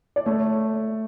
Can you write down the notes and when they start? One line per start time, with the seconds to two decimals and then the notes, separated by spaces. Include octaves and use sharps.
0.16 D5
0.26 A3 C#5